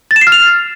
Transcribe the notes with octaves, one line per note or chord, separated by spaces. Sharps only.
A6
E7
C7
F6
F7